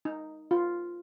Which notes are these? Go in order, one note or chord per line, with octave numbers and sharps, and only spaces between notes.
D#4
F4